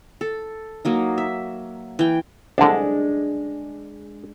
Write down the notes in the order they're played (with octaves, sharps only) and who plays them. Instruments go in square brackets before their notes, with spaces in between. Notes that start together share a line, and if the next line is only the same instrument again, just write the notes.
[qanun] A4
F#3 A#3 D#4
E5
E3 G5
[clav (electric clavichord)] C2 D3 [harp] G#3 D4